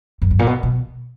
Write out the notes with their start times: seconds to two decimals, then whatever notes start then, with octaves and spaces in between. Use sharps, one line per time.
0.22 F#2
0.31 G2
0.39 A#2
0.47 B2
0.63 B2